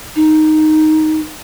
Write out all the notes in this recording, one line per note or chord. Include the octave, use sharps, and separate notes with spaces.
D#4